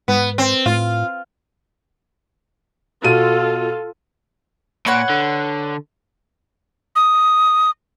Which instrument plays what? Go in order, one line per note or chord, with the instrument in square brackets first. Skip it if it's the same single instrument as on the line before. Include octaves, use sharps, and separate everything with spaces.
[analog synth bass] G#2 [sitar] B3
[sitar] C4
[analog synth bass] A2 [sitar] F4
[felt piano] B2 D#7 [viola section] F4 A4
[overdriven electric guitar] A#2 [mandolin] B4 C#5 F#5
[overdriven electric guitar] D3
[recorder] D#6